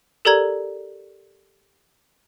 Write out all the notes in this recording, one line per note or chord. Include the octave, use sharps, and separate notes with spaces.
G4 A4 A#4 D5 A#5 G#6